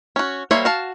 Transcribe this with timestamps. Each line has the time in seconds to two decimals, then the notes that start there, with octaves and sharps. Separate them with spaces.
0.16 C#4 F#4
0.51 G3 A#3 C5 C#5 E5
0.65 F#4 F5 A5